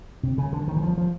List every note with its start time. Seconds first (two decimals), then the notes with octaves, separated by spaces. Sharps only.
0.23 C3
0.38 C#3
0.53 D3
0.68 D#3
0.77 E3
0.83 F3
0.98 F3